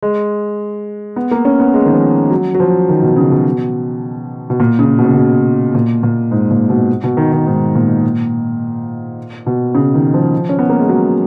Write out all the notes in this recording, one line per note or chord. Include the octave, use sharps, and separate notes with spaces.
G#3
B3
A#3
C#4
B3
G#3
D#3
F3
F#3
F#3
F3
D#3
B2
C#3
B2
B2
A#2
C#3
B2
C#3
B2
A#2
A#2
G#2
A#2
B2
B2
D#3
D#3
G#2
A#2
B2
C#3
D#3
F3
C#4
B3
A#3
G#3
F#3